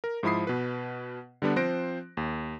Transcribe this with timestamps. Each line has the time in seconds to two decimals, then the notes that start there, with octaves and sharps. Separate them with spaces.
0.04 A#4
0.23 G#2 F3 E4 B5 D#6 C7
0.47 B2 B4
1.42 D3 G3 B3 D4
1.56 F3 C4 C5 F#6 A#6 D7
2.17 D#2